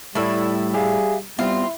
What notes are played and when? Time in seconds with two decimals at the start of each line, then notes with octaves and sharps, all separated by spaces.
0.15 A2 G3 A3 E4 A4 D5
0.74 G4 G#4 E5 F5
1.39 G3 B3 C4 E4 F4